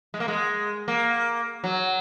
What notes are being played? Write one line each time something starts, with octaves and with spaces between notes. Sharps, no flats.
G#3
A#3
G#3
A#3
F#3